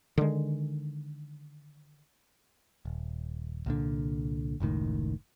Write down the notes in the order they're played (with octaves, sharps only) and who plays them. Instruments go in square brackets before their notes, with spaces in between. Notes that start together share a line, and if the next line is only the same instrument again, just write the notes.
[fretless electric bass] D3 D#3 G#3
[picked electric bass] D#1
C2 A#2 D3
F#1 C#2 A2 D#3